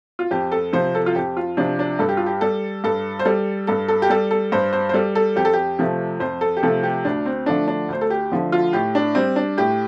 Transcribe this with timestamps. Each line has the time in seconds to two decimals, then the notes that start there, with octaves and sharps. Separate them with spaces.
0.19 F4
0.31 F2 G4
0.52 A4
0.73 C3 F3 C5
0.95 A4
1.06 F4
1.15 F2 G4
1.37 F4
1.57 C3 F3 D4
1.79 D4
1.99 G2 A4
2.09 G4
2.17 F4
2.26 G4
2.41 G3 A4
2.84 G2 A4
3.19 C5
3.25 G3 A4
3.67 G2 A4
3.88 A4
4.02 G4
4.10 G3 A4
4.31 A4
4.52 G2 C5
4.73 C5
4.89 C5
4.94 G3 A4
5.15 A4
5.36 F2 G4
5.45 A4
5.53 G4
5.79 C3 F3 A3
6.20 F2 C5
6.41 A4
6.57 G4
6.63 C3 F3 A3 A4
6.83 G4
7.05 D2 D4
7.26 C4
7.46 D3 F3 A3 D4
7.68 D4
7.89 D2 C5
8.01 A4
8.10 G4
8.32 D3 F3 A3
8.52 F4
8.73 A2 G4
8.95 D4
9.15 G3 C4
9.36 D4
9.57 A2 G4